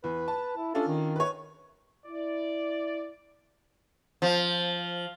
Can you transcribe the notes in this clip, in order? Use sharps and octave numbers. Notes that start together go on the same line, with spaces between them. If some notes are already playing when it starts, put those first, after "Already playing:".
E2 B4
A5
E4
C#4 D4 F4 A4
D#3
B4 C#5
E4 D5
F3